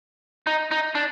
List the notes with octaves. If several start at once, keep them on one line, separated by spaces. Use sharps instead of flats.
D#4
D#4
D4